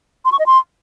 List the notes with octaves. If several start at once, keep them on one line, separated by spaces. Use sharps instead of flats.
C6
C#6
D#5
C6